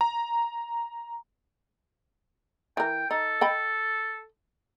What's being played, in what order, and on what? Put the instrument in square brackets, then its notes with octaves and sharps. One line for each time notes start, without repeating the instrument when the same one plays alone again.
[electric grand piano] A#5
[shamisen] E3 A#4 [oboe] G5
[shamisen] D#4 [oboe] A4
[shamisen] D#5 G5 B5